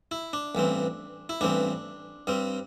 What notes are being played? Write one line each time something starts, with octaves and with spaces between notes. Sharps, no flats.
E4
D4
A1 G2 E3 C4
E4
A1 G2 E3 C4 D4
G2 G3 C4